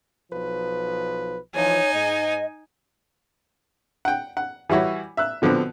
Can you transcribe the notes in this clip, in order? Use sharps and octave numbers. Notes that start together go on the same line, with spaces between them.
B1 F3 B4
E3 F3 D#4 C#5 G#5
G#2 D#5
F#5 G5
F#5
E3 G3 E4 F#4 C#5
E5 E6 F#6
B2 D3 F3 B3 C4